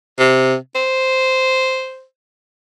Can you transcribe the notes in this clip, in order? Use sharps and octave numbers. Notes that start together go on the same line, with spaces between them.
C3
C5